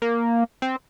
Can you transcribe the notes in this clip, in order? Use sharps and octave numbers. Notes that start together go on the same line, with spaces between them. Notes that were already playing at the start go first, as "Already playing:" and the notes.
A#3
C4